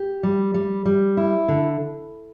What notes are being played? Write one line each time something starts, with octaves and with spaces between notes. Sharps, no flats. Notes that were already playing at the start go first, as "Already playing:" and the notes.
Already playing: G4
G3
G3
G3
E4
D3